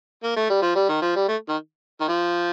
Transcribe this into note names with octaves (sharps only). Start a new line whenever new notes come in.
A#3
A3
G3
F3
G3
D#3
F3
G3
A3
D#3
D#3
F3